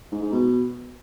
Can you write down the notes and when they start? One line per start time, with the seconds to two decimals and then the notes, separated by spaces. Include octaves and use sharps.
0.12 G#2
0.22 G#2
0.32 B2